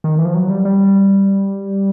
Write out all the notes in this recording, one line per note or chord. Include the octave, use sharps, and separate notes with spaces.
D#3
E3
F3
F#3
G3
G3